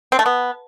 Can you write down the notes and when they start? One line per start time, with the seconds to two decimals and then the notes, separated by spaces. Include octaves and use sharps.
0.12 C4
0.19 A3
0.26 B3